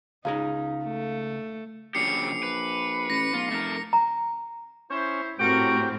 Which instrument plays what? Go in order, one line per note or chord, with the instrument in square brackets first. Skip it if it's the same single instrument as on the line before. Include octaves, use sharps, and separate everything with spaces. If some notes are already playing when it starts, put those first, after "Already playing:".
[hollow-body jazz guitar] C#2 G#4 A#5 [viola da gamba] D#4 [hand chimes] F5
[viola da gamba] A3
[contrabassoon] A#1 [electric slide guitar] C#3 F#3 G4 [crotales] D6 C7 C#7
[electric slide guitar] B4
[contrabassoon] A1 [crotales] A#6 C#7
[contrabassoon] B1 [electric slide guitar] F4
[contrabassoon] F1 [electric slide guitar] A3 A#4
[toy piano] A#5
[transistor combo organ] C#4 [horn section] E4 C5
[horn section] F#2 F#4 A#4 [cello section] A2 C4 [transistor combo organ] G4 [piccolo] D7